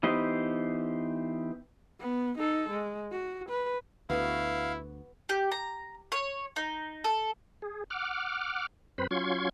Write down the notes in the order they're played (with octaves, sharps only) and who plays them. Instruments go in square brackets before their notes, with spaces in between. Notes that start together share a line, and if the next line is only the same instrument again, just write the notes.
[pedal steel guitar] E3 B3 D#4 G4 C5
[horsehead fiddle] B3
D#4 A4
G#3
F#4
B4
[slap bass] D2 [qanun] B3 F#4 [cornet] E4 [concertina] F5
[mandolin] G4
A#5
C#5
D#4
A4
[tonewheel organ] G#4
F#5 D6 F6
F#2 C4 B4 C5 B5
F#3 C#4 F4 C6 C#6 G#6